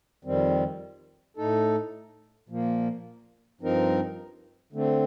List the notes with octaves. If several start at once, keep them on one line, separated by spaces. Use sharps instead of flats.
F2 D#3 G3 C4
A2 A3 D#4 A4
A#2 F3 A#3
G2 F3 C4 D#4 A#4
D3 A3 C4